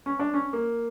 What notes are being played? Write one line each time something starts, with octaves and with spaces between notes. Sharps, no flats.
C#4
D4
C#4
A#3